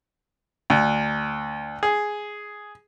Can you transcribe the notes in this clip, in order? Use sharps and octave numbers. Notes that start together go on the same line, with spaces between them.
D2
G#4